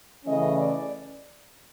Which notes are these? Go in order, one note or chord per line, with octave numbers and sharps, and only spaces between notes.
C#3 E3 A3 C#4 D#5
D5